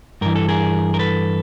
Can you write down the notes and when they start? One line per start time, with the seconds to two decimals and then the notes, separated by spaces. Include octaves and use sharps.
0.21 G2 E3 A#4
0.36 A4
0.48 G#4 A#4
0.94 A#4
0.99 A4 B4